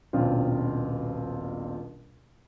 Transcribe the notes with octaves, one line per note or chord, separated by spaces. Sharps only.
D#1 A#1 B2 C4 F4